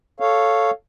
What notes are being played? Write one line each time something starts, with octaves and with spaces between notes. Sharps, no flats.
A4 C#5 F5